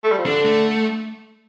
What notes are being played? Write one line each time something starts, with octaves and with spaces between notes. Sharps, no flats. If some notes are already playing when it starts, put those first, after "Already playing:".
A3
G3
F3
D3 D4
A3